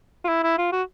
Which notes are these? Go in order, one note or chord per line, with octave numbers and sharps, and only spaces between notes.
F4
E4
E4
F4
F#4